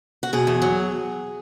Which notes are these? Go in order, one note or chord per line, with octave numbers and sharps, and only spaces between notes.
F#4
B2 G#4
E2
F#3